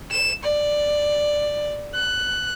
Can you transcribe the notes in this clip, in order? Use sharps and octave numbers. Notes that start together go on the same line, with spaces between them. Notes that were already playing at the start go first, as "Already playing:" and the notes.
E7
D5
F#6